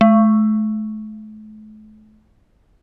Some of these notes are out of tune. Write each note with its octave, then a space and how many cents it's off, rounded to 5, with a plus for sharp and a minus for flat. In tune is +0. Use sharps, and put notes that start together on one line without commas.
A3 -40